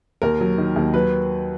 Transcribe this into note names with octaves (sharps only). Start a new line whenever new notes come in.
D#2 A#4
F#3
D#3
D#2
F#3 B4